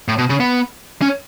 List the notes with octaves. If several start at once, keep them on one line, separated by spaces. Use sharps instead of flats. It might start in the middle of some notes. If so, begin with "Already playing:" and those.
A2
B2
C#3
B3
C#4